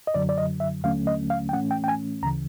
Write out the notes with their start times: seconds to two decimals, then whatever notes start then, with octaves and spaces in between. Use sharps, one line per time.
0.07 D#5
0.14 F#2 D3 F#3 D5
0.29 D5
0.38 D#5
0.60 E5
0.84 D#2 D3 F#3 A3 C#4 F5
1.07 D#5
1.30 F5
1.49 G5
1.53 A2 E3 A3 C#4 F#5
1.71 G5
1.84 G5
1.88 G#5
2.23 D2 C#3 E3 A#5